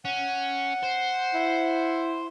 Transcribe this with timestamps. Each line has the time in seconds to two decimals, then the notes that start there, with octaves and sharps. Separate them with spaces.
0.05 C#4 F#5
0.83 C5
1.34 E4